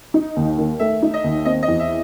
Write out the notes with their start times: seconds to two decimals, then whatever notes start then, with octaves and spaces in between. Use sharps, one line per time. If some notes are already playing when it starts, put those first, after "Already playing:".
0.14 D#4
0.37 D#2
0.58 D#3
0.80 A3 E5
1.02 D#4
1.14 D#5
1.24 D#2
1.45 C4 D#5
1.63 D#5
1.68 E2
1.80 E5